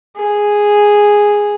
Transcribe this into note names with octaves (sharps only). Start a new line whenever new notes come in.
G#4